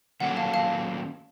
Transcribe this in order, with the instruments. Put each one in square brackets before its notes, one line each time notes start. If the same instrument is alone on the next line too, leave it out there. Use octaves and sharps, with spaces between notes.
[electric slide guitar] D#3 F#3 A#3 C#4 A4 [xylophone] F#5
[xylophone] F5 A5
F5 A5